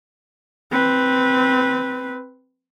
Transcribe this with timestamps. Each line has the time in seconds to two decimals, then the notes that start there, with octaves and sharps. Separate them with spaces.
0.72 C4 B4